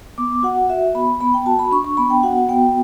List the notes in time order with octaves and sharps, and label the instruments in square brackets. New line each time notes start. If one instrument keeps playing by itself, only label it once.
[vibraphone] B3 D6
F#4 F#5
F#4 E5
B3 B5
B3 B5
G5
F#4 A5
B5
D4 C#6
C#6
B3 B5
G5
F#4 F#5
B3 G5